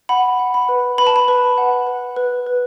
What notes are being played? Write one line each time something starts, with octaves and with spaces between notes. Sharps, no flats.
F#5 B5
F#5
B5
B4
B4 B5
A5
B5
B4
F#5
B4
B4
B4